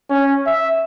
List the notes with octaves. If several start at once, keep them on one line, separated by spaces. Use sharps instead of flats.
C#4
E5